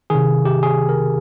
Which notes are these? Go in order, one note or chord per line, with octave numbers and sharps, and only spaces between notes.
C3 D#3 G#4
G4
G#4
A#4